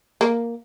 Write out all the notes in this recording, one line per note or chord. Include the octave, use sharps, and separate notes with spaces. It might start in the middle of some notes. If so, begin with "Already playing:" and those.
A#3